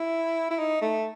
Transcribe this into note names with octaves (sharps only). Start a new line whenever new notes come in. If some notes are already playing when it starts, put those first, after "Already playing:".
Already playing: E4
E4
D#4
A3